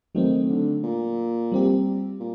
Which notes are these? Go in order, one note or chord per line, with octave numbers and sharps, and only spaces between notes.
D#3 F#3 A3 C4
D3
A#2
G3 C4 G4
A#2